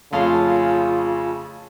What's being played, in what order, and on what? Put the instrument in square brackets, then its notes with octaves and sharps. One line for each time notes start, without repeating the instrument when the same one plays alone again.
[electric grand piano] F2 A3 [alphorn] C#3 [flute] F4 [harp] F5 A5 C6